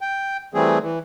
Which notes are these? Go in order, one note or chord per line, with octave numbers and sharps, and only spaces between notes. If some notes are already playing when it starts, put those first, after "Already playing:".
G5
E3 G3 A3 C4 G#4
E3